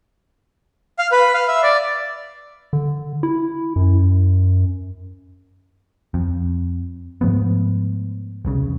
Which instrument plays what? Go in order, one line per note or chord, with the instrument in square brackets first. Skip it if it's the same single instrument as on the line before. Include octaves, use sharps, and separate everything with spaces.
[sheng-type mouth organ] F5
B4
F5
E5
D5
[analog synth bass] D3
E4
F#2
[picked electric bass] F2
G#2 F3 A3 B3
E1 C2 C#3